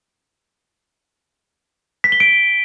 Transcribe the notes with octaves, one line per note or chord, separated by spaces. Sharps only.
B6
G7
D7